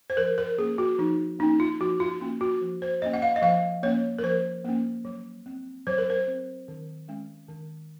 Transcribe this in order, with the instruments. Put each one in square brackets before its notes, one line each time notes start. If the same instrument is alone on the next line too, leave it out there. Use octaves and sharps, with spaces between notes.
[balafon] C5
F3 A#4
A#4
A#3 C#4 G#4
F#4
F3 D#4
A#3 D#4
C#4
F4
F3 F#4
F4
A#3 C#4 F4
F#4
F3
C5
A#3 C#4 D#5
F#5
F5
D#5
F3 F5
A#3 C#4 C#5
A#4
F3 C5
A#3 C#4
F#3
C4
F#3 C5
A#4
C5
C4
D#3
G#3 C#4
D#3